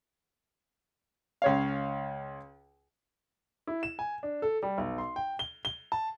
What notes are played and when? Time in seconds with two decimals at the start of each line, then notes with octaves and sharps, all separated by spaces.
1.42 C#2 C#5 F5
3.67 E4
3.83 E7
3.99 G#5
4.23 D4
4.42 A4
4.63 G3
4.78 B1
4.98 C6
5.16 G5
5.39 G7
5.65 G7
5.92 A5